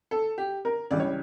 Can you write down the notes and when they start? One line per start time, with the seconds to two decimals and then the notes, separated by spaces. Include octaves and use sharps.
0.11 A4
0.38 G4
0.65 A#4
0.91 C#2 C#3 E3 G3 D5
1.00 C#5